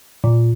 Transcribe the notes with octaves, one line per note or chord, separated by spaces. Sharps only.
A#2